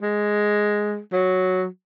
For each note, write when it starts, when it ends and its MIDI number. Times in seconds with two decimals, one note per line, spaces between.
0.02 0.99 56
1.12 1.65 54